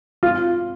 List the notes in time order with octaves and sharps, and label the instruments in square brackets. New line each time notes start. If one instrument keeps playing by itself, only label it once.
[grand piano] F4